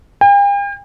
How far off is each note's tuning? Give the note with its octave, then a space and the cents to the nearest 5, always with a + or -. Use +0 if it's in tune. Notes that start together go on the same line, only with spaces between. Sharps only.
G5 +45